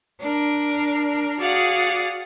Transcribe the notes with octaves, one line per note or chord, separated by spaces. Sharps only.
D4 A#4
F#4 G#4 D5 F5 F#5